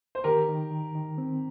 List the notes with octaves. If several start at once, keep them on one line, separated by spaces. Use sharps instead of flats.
C5
D#3 G4 A#4
D#3
D#3
D#3
C4